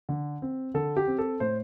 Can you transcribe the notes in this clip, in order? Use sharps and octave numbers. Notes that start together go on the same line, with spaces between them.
D3
C4
D3 A4
G4
C4
A4
A2 C5